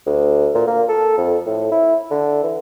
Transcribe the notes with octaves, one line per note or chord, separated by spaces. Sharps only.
D2
A#2
A#3
A4
F2
A2
E4
D3
E3